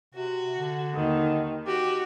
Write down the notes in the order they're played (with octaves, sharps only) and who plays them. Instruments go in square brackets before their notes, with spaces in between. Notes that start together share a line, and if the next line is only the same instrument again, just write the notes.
[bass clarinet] C3 [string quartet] F#4
[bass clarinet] D3
[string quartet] D#2 D#3
[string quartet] F#4 [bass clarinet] G4